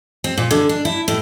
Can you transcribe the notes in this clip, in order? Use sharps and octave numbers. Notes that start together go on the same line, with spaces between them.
C4
A#2
D3
D4
E4
A2